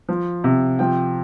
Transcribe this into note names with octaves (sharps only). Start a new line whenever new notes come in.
F3
C3
F3 G5